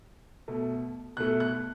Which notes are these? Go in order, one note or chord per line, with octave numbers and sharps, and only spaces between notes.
B2 A3
B2 A3 F#6
F#6